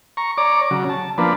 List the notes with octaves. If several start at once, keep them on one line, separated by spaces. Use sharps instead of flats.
A#5 C#6
C#5 D5 A#5 D6
C#3 F#3
A5
F3 A#3 D4 B4